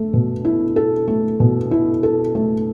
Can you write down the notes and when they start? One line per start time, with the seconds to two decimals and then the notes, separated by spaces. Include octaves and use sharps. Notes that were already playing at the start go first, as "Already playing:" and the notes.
Already playing: A3
0.13 B2
0.45 E4
0.76 A4
1.08 A3
1.40 B2
1.71 E4
2.03 A4
2.35 A3